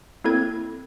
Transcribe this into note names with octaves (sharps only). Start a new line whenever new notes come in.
A#3 C4 E4 A4 G#6